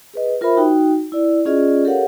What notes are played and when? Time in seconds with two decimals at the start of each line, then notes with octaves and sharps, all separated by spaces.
0.14 G#4 B4 D#5
0.41 F4 A#4 C5 E5 B5
0.57 D#4 F#4 G5
1.12 E4 D5
1.45 C#4 F4 G#4 D5 D#5
1.84 G4 A4 A#4 C#5 F5 F#5